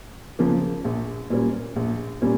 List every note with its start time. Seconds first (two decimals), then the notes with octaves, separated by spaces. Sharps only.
0.39 C#3 F3 A#3
0.84 A#1
1.30 A#2 G3 A#3 C#4
1.76 A#1
2.21 A#2 G3 A#3 C#4